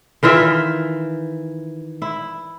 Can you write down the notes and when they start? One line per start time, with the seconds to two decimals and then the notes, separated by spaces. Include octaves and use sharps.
0.23 D#3 E3 F4 E5
2.02 E4